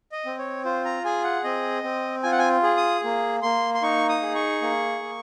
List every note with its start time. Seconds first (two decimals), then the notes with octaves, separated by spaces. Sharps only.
0.12 D#5
0.26 C4
0.38 C#5
0.65 F4 C5
0.85 A#5
1.05 G#4 G#5
1.24 F#5
1.44 C4 D#5
1.84 C4
2.23 F4 G#5
2.31 F#5
2.39 G#5
2.63 G#4
2.77 D#6
3.04 A#3
3.42 A#3 C6
3.74 C6
3.82 D#4 C#6
4.09 D#6
4.22 G#4
4.35 C#6
4.62 A#3
5.02 A#3